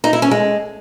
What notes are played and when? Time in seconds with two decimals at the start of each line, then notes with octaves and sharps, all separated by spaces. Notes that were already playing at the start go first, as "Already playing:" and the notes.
0.04 D#4
0.13 E4
0.22 C#4
0.31 G#3